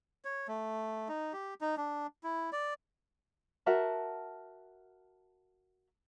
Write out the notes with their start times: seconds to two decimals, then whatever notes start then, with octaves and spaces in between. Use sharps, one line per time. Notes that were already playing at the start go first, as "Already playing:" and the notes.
0.25 C#5
0.48 A3
1.09 D#4
1.33 G4
1.61 D#4
1.77 D4
2.24 E4
2.53 D5
3.66 F#4 A#4 E5 A5